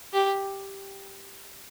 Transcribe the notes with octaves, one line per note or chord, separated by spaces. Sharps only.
G4